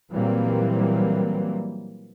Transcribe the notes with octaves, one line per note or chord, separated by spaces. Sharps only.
A#2 E3 F#3 G3 A#3 C4